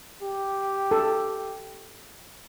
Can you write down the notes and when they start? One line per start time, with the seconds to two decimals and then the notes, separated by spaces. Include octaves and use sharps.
0.22 G4
0.91 A4